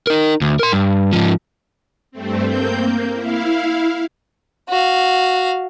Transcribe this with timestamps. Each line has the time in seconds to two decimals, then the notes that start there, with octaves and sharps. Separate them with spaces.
0.07 D#4 A#4
0.41 D2
0.59 A#4 C6
0.72 G2
1.13 G#2 F3
2.11 G2 A3 C4
2.45 A#3 C4 G6
2.81 A#3
3.13 E4 F5
4.69 F#4 F5